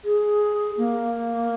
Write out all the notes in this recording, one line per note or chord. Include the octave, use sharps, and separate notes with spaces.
G#4
A#3